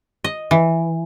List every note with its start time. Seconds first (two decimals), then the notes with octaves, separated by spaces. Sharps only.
0.24 D#5
0.51 E3